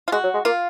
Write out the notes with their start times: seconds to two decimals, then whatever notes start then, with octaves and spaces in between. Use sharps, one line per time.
0.08 F4
0.12 G#3 F#4
0.24 F#3
0.34 G#3
0.45 A#3 F4